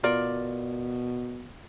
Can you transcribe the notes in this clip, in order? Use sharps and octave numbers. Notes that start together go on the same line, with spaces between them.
B2 F4 A#4 D5